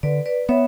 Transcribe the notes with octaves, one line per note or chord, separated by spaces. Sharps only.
D3 B4 D5
B4 D5
B3 C#5 E5